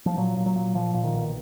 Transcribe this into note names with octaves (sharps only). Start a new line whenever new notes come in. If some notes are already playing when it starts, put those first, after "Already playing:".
F3
A#2 F#3
A#2
F#3
A#2
A#2 F3
A#2
D#3
B1